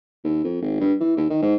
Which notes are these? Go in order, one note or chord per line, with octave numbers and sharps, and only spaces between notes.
D#2
F2
G#1
G2
E3
D#2
D#3
G#2